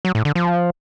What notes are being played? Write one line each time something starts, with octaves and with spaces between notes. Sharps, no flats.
F#3
A2
D3
F3